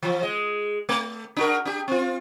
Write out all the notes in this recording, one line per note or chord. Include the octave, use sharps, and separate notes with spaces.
E3 F3
G#3 D#5
A3
D4 F#4 A#4
D4 G4
C4 F4